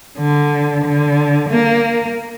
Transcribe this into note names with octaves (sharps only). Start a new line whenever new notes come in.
D3
D3
A#3